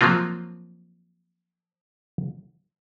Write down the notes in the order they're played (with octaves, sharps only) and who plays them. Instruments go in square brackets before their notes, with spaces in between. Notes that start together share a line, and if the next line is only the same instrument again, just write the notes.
[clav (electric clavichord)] F3 F#3 A#3 C4 F4